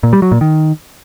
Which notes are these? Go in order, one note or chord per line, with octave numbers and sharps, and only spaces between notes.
A#2
G3
F#3
A#2
D#3